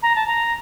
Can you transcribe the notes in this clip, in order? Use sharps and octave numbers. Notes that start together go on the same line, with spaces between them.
A#5
A5
A#5